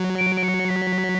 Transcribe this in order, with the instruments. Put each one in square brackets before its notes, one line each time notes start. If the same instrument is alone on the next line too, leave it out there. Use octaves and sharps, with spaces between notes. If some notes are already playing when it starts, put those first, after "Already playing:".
Already playing: [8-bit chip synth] F#3
[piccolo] D7
D7
C#7
B6